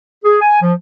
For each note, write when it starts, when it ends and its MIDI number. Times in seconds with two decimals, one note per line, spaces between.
0.25 0.37 68
0.41 0.62 80
0.62 0.73 53